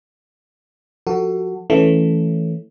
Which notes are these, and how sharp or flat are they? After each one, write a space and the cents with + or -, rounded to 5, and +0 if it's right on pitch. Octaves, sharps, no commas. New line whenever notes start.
F3 +35 F#4 +15 A4 +25
E3 +0 A3 +0 C#4 +0